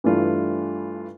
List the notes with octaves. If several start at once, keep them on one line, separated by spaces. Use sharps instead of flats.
G2 E3 A3 D4 F4